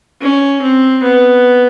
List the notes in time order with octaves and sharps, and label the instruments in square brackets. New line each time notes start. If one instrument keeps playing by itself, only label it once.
[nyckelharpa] C#4
C4
B3